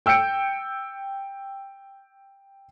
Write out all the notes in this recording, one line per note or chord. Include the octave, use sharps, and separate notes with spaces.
G5 E6 G6 C#7 D7